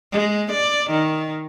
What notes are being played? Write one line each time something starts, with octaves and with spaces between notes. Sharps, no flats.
G#3
D5
D#3